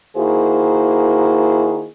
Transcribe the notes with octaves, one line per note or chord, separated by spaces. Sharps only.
D#3 A#3 E4 F#4 G#4 C5